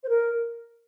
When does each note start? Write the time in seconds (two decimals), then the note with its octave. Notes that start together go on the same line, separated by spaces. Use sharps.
0.03 C5
0.09 A#4